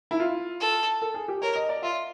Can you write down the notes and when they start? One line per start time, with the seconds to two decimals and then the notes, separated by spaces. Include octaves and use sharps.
0.11 E4
0.20 F4
0.60 A4
1.02 A4
1.14 G#4
1.28 G4
1.42 A#4 C#5
1.55 D#5
1.69 D5
1.82 F4 E5